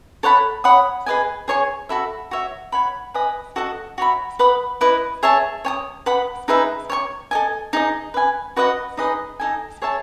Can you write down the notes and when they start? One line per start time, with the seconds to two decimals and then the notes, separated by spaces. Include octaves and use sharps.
0.23 A4 C#5 F#5 B5
0.64 C#5 F#5 B5 D#6
1.06 G#4 B4 D#5 G#5
1.48 G#4 C#5 G#5 C#6
1.89 F#4 A4 E5 B5
2.31 F#4 C#5 E5
2.72 C#5 F#5 B5
3.14 B4 D#5 G#5 D#6
3.56 F#4 A4 D#5 F#5
3.98 F#4 C#5 E5 B5
4.39 B4 F#5 B5 D#6
4.81 E4 B4 D#5
5.23 G#4 C#5 E5 A5
5.65 C#5 G#5 D#6
6.06 B4 F#5 B5 D#6
6.48 D#4 G#4 B4 E5
6.90 C#5 G#5 C#6
7.31 A4 D#5 G#5
7.73 D#4 G#4 D#5
8.14 B4 E5 G#5
8.56 F#4 B4 D#5 F#5
8.97 D#4 G#4 B4 D#5
9.40 D#4 A4 D#5 G#5
9.82 G#4 C#5 E5 A5